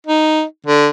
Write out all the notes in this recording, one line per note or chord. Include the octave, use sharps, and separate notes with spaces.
D#4
D3